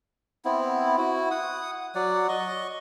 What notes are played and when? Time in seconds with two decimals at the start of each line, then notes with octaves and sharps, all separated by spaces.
0.45 B3 C4 E4
0.98 E4 F#4
1.31 F#5 D#6
1.95 F#3 D5 F#5
2.28 D#5 C#6